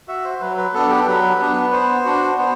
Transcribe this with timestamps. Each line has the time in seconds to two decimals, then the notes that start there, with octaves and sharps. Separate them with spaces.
0.08 F#4 E5
0.25 C5
0.41 F#3 B4
0.57 B4
0.74 B3 D4 A4
0.90 G4
1.01 A4
1.07 F#3 B4
1.40 B3 D4
1.72 B3 C5
2.05 D4 F#4
2.38 B3 C5